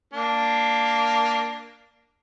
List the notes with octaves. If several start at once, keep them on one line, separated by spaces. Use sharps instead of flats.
A#3 D4